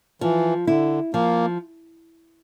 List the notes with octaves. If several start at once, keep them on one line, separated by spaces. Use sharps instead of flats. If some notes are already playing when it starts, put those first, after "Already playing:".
E3 F3
D3 E4
F3 A#3